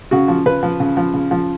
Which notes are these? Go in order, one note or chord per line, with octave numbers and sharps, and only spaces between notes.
C#3 F#4
F3
C#3 B4
F3
C#3
F3
C#3
F3